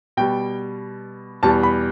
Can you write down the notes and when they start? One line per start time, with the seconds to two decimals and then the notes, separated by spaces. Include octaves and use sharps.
0.17 B2 G3 G5
1.43 E2 B2 G3 A5
1.63 B5